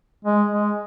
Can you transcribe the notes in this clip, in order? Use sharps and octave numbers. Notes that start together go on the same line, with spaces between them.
G#3
G#3